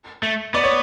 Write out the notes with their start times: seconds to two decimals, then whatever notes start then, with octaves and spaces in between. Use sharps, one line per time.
0.23 A3
0.54 B3 D5
0.64 C#5